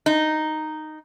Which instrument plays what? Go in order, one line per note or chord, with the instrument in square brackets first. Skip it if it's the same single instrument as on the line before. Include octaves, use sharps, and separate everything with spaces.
[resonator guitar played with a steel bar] D#4